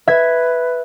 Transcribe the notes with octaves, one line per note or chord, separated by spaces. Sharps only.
B4 E5 G#6